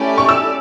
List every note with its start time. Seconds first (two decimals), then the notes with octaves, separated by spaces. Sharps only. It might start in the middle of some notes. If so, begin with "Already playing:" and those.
Already playing: A3 C#4 E4 G4 D5
0.18 C#6
0.29 E6